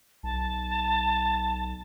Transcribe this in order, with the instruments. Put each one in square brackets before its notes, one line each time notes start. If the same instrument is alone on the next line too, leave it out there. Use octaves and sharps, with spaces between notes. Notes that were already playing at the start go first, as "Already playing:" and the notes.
[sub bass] B1 [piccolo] A5